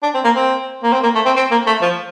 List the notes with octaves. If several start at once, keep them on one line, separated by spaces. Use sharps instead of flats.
D4
C4
A#3
C4
A#3
C4
A#3
A3
C4
C4
A#3
A3
F3